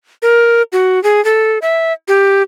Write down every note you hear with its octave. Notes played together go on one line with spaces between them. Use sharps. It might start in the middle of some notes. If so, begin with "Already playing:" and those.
A#4
F#4
G#4
A4
E5
G4